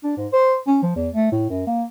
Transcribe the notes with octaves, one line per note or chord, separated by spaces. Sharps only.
D4
G#2
C5
C#4
F3
E2
A3
A2
F#2
A#3